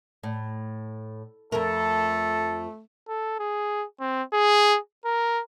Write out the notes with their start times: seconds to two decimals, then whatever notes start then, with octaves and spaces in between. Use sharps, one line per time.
0.23 A2
1.52 F2 A3 A4 A#4
3.09 A4
3.39 G#4
4.00 C4
4.33 G#4
5.05 A#4